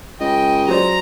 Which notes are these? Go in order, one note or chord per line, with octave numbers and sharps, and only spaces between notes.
C#2 D#5 G5
F#3 C5 D5 A#5